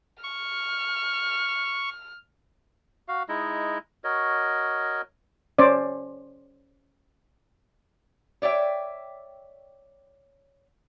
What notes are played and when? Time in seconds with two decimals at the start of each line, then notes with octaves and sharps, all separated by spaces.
0.23 C#6 F6
3.08 F#4 F5
3.29 G#3 D#4 E4 D#5
4.04 F#4 A#4 C#5 D#5
5.58 C#4 C5 D5
8.42 C#5 D5 E5 G5